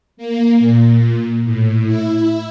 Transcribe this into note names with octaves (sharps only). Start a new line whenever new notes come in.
A#3
A#2
A2
E4